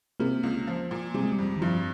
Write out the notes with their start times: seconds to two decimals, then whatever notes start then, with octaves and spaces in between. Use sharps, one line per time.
0.20 C3 A#3
0.43 C#2
0.67 F3
0.91 A#2
1.14 C3 G3
1.23 G#3
1.32 G3
1.38 F2
1.56 D#3
1.61 G2 F3